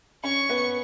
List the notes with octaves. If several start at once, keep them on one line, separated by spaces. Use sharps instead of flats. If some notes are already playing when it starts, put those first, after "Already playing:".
C#4 C#6
B3